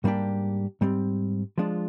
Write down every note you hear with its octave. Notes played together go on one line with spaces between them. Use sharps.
G#2 G3 A#3 D4 G4
G#2 G3 C4
F3 G#3 D4 F4